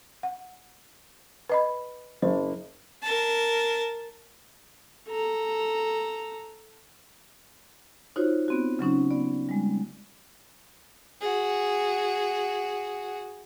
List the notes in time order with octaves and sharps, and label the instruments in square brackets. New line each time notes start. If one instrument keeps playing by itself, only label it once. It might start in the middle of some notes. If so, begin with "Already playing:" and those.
[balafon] F#5
B4 D#5 B5
[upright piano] F#1 [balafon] C5
[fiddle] A#4 A5
[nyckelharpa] A4 A#5
[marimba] D#4 F4 F#4 C5 C#5
B3 C4 F#4
C#3 F#3 C#4 D#4
B3 D5
G3 G#3
[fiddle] F#4 G#4